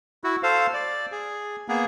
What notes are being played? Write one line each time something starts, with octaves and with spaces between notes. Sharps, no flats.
E4 F#4
A4 C5 F5
D5
G#4
A#3 B3 G#4